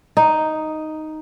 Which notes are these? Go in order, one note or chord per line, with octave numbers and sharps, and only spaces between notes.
D#4